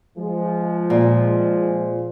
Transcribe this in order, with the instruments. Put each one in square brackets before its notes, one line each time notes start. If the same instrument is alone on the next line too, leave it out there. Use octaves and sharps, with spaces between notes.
[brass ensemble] F3 G#3
[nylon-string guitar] A#2